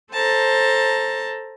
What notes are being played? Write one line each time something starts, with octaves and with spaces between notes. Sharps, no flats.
A4 C5 A5 A#5